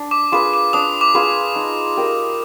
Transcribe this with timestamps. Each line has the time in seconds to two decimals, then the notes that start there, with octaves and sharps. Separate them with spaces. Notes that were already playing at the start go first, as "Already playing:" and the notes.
Already playing: D4
0.11 D6
0.32 F4 G#4 B4 D6
0.54 D6
0.73 D4 D#6
1.01 D6
1.15 F4 G#4 B4
1.56 D#4
1.97 G4 A#4 D#5